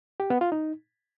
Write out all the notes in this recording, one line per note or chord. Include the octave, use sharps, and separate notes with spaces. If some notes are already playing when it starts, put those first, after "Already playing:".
G4
B3
F4
D#4